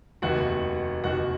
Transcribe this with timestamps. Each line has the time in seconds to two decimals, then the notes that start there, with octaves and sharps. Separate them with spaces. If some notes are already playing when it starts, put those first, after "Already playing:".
0.22 F1 D#2 D#3 F#4 F#5
1.04 F1 D#2 D#3 F#4 F#5